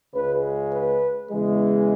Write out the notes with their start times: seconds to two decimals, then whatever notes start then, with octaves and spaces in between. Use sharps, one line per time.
0.15 C#2 C#3 G#3 B4
0.72 B4
1.30 E2 C#3 E3 G#3